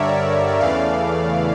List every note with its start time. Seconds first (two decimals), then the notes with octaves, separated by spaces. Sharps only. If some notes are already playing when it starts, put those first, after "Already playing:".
Already playing: G2 D3 G3 A#4 C#5 D5 E5
0.60 E2 C#3 E3 A3 D5 F5